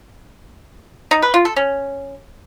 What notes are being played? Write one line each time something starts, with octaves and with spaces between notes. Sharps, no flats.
D#4
B4
F4
A4
C#4